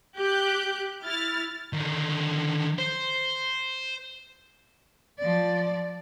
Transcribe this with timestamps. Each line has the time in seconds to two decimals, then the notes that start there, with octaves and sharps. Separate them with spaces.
0.18 G4 F#6 G6
1.02 E4 F6 A6
1.73 D3 D#3
2.79 C5
5.19 F3 D5